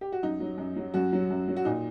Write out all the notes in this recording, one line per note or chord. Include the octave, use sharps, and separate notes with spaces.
G4
F#4
F#2 D#4
F#3
F#2
F#3
F#2 F#4
F#3
F#2
F#3
F#4
A#2 D#4